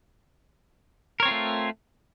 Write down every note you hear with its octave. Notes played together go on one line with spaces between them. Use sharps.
A3 C4 F4 A#4 C#5